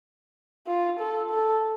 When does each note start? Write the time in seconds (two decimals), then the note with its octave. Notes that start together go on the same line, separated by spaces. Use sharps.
0.67 F4
1.00 A4
1.30 A4